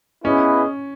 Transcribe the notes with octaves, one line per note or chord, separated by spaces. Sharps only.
B3 C#4 E4 G#4 B4 D#5